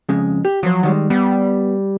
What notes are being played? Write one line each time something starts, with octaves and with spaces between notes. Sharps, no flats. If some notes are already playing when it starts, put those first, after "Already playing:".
F2 C#3 G#3
G4
F3 F#3 C5
D#3 G3 G#3
G3 B3